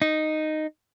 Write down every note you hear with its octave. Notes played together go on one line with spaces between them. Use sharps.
D#4